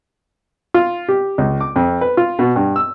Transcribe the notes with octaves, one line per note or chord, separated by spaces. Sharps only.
F4
G4
C#2
D6
F2
B4
F4
B2
G2
E6